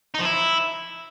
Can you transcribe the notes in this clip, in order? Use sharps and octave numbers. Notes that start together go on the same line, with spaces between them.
D#4
F3
E4